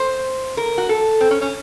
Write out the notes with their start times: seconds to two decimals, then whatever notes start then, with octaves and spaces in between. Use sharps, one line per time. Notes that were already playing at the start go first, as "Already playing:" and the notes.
Already playing: C5
0.57 A#4
0.78 F#4
0.89 A4
1.21 C4
1.31 C#4
1.41 C#4